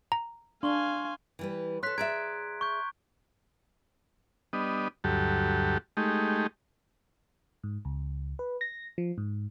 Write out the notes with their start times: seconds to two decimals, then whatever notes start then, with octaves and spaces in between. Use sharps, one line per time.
0.12 A#5
0.63 D4 F5 G#5 C6 C#6 G7
1.39 E3 G3 B4
1.83 A4 C#5 C6 F#6 B6
1.98 G#4 D5 E5 A#5 G#6 D7
2.61 C#6 G6
4.53 G3 B3 D4 D#5
5.04 D2 G2 F#3 G4 A4
5.97 G#3 A3 D#4 G4
7.64 G#2
7.85 C#2
8.39 B4
8.61 A#6
8.98 F3
9.18 G#2